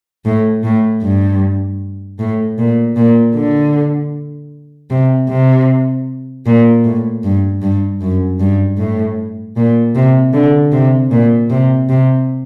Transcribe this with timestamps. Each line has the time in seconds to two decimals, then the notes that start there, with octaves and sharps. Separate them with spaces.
0.25 A2
0.63 A2
1.02 G2
2.19 A2
2.58 A#2
2.96 A#2
3.35 D3
4.90 C3
5.29 C3
6.46 A#2
6.84 A2
7.23 G2
7.62 G2
8.01 F#2
8.40 G2
8.78 A2
9.56 A#2
9.95 C3
10.33 D3
10.72 C3
11.11 A#2
11.50 C3
11.89 C3